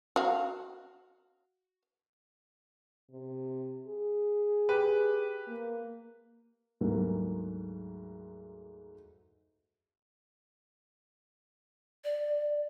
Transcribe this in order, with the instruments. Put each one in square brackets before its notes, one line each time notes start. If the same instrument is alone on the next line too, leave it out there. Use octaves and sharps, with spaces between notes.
[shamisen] F#4 F5
[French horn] C3
G#4
[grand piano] G4 B4
[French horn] A#3
[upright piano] D2 G#2 F#3 G3 A#3
[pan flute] D5